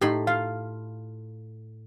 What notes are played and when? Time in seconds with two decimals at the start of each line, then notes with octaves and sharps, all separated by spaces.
0.01 A2 D#4 G4 B5 C6
0.27 F4 F5